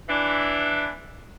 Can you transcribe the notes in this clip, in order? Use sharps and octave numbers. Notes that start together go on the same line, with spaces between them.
E3 D4